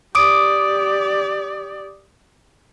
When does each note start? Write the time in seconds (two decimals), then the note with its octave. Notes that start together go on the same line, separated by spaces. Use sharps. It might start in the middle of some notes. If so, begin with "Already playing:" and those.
0.15 G4 D5 D6 D#6 D7